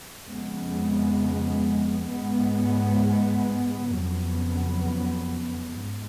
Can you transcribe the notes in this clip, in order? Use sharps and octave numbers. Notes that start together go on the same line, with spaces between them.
F2 C#3 G#3 B3
G#2 G#3 B3
F2 C#3 F#3 B3
G#2